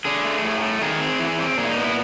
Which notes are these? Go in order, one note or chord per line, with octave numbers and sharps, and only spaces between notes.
D3 G#4
A3
A2
A3
D#3 G#4
C4
E3
C4
A#2 G#4
E4
D#4
B3
E4